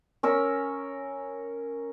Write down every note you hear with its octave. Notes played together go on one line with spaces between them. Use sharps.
C#4 A#4 E6